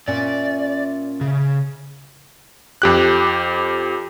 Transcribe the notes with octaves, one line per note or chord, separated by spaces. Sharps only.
A#2 C#4 D5 E5
C#3
F2 G4 F#6